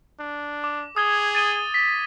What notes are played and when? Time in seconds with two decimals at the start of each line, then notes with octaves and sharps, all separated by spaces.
0.19 D4
0.64 D6
0.96 G#4 D#6 G#6 G7
1.35 A6 D#7 G7
1.74 B6